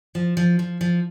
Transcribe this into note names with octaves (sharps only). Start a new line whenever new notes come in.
F3
F3
F3
F3